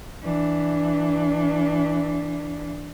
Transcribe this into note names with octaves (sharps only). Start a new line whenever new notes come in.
E3 D4